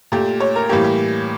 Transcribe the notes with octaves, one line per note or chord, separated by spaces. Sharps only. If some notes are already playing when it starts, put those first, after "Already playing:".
A#2 A3 G4
C#5
A#4
A2 E3 G3 A#3 G4
G4